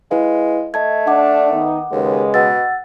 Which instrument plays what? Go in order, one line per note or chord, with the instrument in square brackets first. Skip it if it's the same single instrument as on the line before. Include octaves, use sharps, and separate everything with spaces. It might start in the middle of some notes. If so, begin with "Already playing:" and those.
[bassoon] G#3 [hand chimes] E4 B4 F5
[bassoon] A3 [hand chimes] D#5 A5 G#6
[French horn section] D4 [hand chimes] F#5 D6
[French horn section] D#3 B3 D#4
[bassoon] D#2 [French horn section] C#3 G#3 B4
[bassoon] B2 [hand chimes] F#5 E6 A6